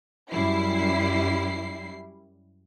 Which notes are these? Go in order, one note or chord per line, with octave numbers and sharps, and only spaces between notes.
F#2 G3 E4 C7